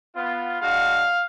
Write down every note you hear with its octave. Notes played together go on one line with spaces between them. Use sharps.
B3 F4
G#3 D4 F#4 F5